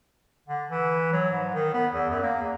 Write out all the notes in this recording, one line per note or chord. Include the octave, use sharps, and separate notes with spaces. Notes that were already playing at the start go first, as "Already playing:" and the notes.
D3
E3
F#3
G#2
D#3
B3
E2
F#2
A#3
E2